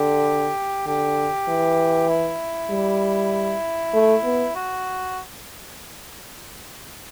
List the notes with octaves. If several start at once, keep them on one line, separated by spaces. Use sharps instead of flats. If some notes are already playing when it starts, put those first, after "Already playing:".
Already playing: D3 G4
D3 G4
E3
E4
G3
A3
B3
F#4